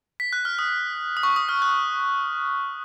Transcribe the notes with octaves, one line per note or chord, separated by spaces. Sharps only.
B6
F#6
F6
D#6
D#6
C#6
D#6
F6
F#6